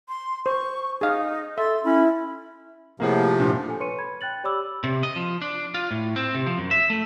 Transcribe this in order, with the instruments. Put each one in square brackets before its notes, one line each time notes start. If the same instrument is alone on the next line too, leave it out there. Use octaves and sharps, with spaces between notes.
[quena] C6
[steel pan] C5 [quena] C#6
[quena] D#4 [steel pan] G#4 F5
[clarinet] A4 [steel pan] E5 [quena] C6
[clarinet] C#4 [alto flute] E4 [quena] B5
[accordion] A2 C3 F3 [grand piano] A#3 G#4 F#5
[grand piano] G2 A#2
[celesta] A4 G#5
B4 C#5 C6 C#6 C#7 D#7
B5 G#6
G5 F#6 A6 F#7
G4 C#5 D5 B5 D6 E6
[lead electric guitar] C3
D#5
F3
D4
F4
A2
C4
C3
F3
F#2
E5
A3